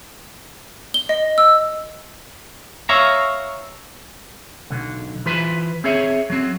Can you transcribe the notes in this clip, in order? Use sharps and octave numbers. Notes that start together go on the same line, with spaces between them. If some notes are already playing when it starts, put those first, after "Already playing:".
G7
D#5
E6
C#5 E5 F5 G#5 A#5
B1 D3
E3 F4 B4 C5 B5 C6
C4 G#4 C#5 E5
F#3 C4